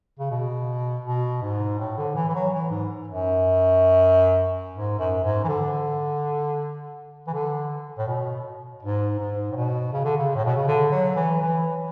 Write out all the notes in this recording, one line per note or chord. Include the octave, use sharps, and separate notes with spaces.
C#3
B2
B2
G#2
A2
D3
E3
E3
F#3
E3
G#2
F#2
G#2
F#2
G#2
E3
D3
E3
D3
A2
B2
G#2
G#2
A2
B2
C#3
D3
C#3
A2
B2
C#3
D3
F#3
E3
E3